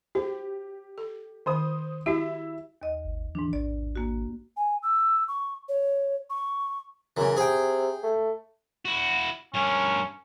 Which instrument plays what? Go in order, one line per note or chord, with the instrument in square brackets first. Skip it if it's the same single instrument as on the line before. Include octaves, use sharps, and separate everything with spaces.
[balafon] F#4 C5 [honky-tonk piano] G4
[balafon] A4
[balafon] D#3 [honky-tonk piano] C5 D#6
[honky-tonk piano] E4 E5 [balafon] F#4 G4
[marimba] D#2 D#5
[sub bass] G#1
[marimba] G#2 D4 [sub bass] E3
[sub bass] A1 [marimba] D5
[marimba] A#3 F#4
[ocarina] G#5
E6
C#6
C#5
C#6
[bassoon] F#2 [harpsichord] C#3 E3
[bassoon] C3 [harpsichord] G#4 G5
[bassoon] A3
[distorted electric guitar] E4 F#4
[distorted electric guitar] G2 A#4 [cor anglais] C#4